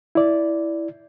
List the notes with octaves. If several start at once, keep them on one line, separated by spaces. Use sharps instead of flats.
E4 D5